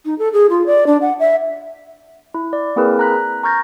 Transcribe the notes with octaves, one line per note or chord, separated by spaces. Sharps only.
D#4
A4
G#4
F4
D5
D4
F#5
E5
E4
D5
A#3 C4 E4 G#4 A#4 B4
A#5 F#6 B6
A#5 C#6 F6 G6 A6 A#6